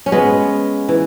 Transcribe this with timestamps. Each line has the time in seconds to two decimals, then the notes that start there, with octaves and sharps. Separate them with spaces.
0.06 C#4
0.12 G#3 B3
0.89 E3